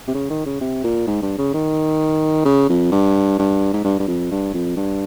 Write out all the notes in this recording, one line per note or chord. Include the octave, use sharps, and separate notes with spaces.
C3
C#3
D#3
C#3
C3
A#2
G#2
G2
C#3
D#3
C#3
F2
G2
G2
G#2
G2
G2
F2
G2
F2
G2